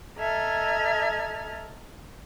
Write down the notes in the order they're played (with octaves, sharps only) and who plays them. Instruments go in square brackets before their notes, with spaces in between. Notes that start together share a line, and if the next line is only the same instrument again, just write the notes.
[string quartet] A4 D#5 E5 A#5 F6 G#6